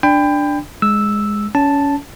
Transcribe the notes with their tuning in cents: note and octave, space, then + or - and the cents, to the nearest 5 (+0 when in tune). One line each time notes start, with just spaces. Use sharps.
D4 +0 G5 +20 B5 +30
G#3 +0 E6 +0
C#4 +25 A5 +0